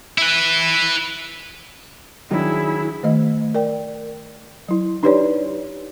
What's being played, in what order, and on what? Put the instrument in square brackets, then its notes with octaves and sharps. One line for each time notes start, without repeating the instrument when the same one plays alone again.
[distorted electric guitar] E4 B4
[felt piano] D#3 F#3 D4 [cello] E4 G#4
[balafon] D#3 A3 D#5
A#4 D5 G5
F#3 E4
D4 D#4 G4 B4 C#5 D5